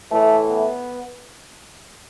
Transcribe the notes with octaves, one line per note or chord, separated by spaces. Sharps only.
A2 E3 A3
B3